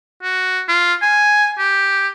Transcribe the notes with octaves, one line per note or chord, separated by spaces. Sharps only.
F#4
F4
G#5
G4